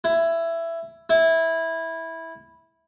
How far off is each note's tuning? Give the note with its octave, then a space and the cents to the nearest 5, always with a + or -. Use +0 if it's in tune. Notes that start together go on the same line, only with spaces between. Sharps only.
E4 +15
E4 -10